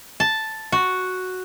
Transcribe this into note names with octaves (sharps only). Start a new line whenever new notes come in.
A5
F#4